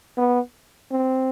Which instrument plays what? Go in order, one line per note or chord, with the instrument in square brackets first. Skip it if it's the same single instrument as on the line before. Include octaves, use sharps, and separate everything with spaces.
[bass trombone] B3
C4